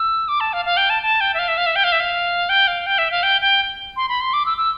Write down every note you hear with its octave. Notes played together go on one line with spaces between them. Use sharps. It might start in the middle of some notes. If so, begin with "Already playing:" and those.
Already playing: E6
D6
A5
F5
F5
G5
A5
A5
G5
E5
F5
E5
F5
E5
G5
F5
E5
F5
G5
F5
G5
E5
F5
G5
G5
C6
B5
C6
D6
E6
E6